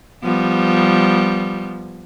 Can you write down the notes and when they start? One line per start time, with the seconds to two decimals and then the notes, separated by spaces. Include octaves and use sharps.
0.23 F3 G3 B3